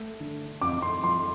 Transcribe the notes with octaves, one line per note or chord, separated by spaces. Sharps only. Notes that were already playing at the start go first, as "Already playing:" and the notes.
Already playing: A3
D3
F2 D6
C6
F3 C6